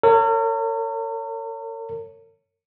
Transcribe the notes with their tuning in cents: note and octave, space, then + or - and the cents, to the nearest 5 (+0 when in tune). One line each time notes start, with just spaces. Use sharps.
A#4 -45 C#5 +0